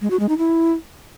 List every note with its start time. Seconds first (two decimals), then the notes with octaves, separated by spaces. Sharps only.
0.01 G#3
0.11 F#4
0.20 G#3
0.29 D#4
0.38 E4